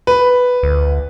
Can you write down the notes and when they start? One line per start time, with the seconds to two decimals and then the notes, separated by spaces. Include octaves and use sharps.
0.07 B4
0.63 D2